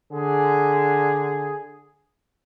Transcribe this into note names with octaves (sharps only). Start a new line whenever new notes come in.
D3 G#4